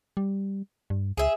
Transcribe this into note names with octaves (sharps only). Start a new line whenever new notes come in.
G3
G2
C#2 G#4 E5